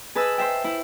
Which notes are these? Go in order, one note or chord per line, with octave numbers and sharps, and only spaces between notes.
G#4 B4 D#5 A5 E6
C5 E5 G5
E4